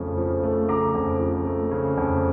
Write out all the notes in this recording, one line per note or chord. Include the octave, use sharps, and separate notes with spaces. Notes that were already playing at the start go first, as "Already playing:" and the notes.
Already playing: F2 C#3 A3
F3
A3
C#3 A#5 D6
F2
F3
A3
C#3
F2